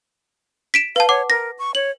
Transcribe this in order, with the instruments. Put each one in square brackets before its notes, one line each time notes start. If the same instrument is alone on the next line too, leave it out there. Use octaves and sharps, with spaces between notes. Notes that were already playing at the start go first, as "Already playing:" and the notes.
[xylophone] B6 D7 E7
[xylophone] B4 A5 [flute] F5
[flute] C#5 [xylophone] F#5 D6
[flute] A#4 [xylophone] A#6
[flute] C#6
[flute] C#5 [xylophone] F#7